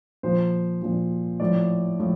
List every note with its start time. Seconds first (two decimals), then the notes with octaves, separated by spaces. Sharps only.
0.23 A#2 F3 C5
0.82 A#2 F3
1.40 A2 F3 D5
2.00 A2 F3